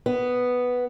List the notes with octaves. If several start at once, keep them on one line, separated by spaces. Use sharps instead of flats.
B3